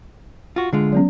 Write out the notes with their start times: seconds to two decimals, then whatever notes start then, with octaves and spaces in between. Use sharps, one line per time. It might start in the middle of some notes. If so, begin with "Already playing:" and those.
0.56 F4 F#4
0.73 D3 G#3 F4
0.93 F#3 B3 C#4